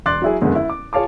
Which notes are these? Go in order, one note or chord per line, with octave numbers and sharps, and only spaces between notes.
E1 C6 D6 F#6 A6
F#3 E4 G#4
F#1 E2 D3 G#3
E4
D6
F4 G#4 C#5 F5 A5 D6